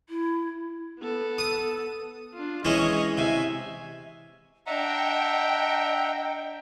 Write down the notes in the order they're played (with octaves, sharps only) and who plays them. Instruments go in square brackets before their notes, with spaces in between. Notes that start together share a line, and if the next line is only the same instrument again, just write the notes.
[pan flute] E4
[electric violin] B3 A4
[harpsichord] D#6
[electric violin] D4 F4
[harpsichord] E3 G#3 C#4 [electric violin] C#5 D#5
[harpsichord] C3 [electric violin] E5 G#5
[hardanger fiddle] D4 [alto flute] D#5 [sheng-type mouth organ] E5 F#5 A#5 [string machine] G5